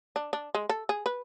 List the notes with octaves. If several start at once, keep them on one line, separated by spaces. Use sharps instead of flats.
D4
D4
G#3
A4
G#4
B4